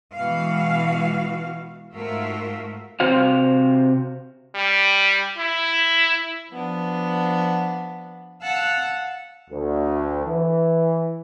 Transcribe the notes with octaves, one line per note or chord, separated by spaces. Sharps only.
B2 E3 G#3 F#4 F5
G#2 A3 F4 F#4 A#4 E5
C3 F#4 C5 F5
G3
E4
F3 B3 D4
F5 F#5 A5 E6 F#6
D2
E3